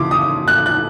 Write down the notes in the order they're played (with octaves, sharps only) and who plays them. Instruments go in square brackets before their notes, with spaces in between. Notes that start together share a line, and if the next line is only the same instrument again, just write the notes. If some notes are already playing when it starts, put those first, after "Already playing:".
Already playing: [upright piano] C#3 E3 C6 D6
D#6
F#6
F#6